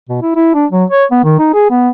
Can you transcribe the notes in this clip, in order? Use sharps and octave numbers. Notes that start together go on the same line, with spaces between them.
B2
E4
E4
D4
F#3
C#5
B3
D#3
D#4
G#4
B3